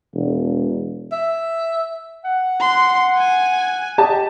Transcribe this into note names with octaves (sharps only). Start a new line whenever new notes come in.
E1
E5
F#5
C6
G#5
G4 D#5 A5